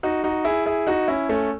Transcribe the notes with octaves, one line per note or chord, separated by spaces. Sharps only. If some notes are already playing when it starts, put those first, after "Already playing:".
D#4 F#4
D#4 F#4
E4 G#4
E4 G#4
D#4 F#4
C#4 E4
A3 C#4